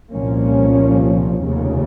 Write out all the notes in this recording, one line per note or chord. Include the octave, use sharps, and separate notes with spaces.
C2 A#2 F3 A#3 C#4
F1 D#2 C#3